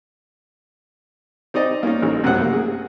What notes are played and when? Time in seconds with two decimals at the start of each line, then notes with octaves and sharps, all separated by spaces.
1.54 C4 D#4 D5 D#5
1.83 A#3 C#4 D#4
2.02 A1
2.24 F#2 C3 F#3 A3 C5 F#5
2.40 A#3
2.53 G#4